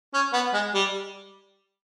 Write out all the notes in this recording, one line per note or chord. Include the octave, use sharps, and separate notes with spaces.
C#4
B3
G#3
G3